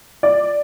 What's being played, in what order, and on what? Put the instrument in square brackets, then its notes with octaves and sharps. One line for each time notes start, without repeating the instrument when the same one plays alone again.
[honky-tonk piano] D5